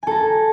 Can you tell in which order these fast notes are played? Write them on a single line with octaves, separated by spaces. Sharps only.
G#5 A4 A#5